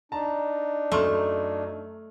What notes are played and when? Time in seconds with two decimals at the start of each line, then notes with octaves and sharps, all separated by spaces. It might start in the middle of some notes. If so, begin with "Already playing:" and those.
0.12 D4 D#4 A5 A#5
0.92 F#2 A3 C6 F6